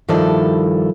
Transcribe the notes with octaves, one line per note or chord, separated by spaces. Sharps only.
G2 D#3 F3 E4 A4 D5